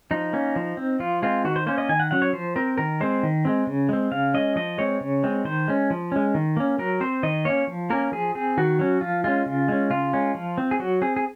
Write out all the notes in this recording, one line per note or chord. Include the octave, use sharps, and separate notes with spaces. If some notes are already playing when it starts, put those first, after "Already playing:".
F3 D#4
A#3 C#4
F3
C4
F3 F4
G#3 C4 F4
D#3 F#4
C5
A#3 C#4 C5
D#5
D#3 G#5
F#5
F#3 C#4 F#5
C#5
F3 C5
C4 A#4
D#3 A#4
G#3 C4 C5
D#3
G#3 C4
C#3
G#3 C4
C#3 F5
G#3 C#4 D#5
F3 D#5
G#3 C4 C#5
C#3
G#3 C4
D#3 C5
G#3 C#4
F3
G#3 C#4
D#3
A#3 C#4
F#3 A#4
C4 C5
D#3 D#5
A#3 C#4 C#5
F3
A#3 C#4 A#4
F3 G#4
C4 G#4
D#3 F#4
F#3 C#4
F3 F4
G#3 C#4 F4
C#3
G#3 C#4
C#3 F4
G#3 C#4
F3
C4
G#4
F#3 F#4
C4 G#4
G#4